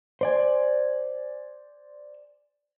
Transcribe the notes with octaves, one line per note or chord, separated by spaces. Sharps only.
C5 D5 G#5